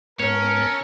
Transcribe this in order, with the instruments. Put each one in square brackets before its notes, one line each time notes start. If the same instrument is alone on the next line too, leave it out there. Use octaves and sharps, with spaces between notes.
[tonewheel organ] G#2 B3 [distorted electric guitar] C#4 [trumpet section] A4 A#4 [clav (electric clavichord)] C#5